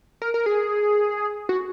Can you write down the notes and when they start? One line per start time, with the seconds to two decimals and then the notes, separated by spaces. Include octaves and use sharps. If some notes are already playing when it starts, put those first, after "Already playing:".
0.22 A#4
0.34 A#4
0.46 G#4
1.49 F#4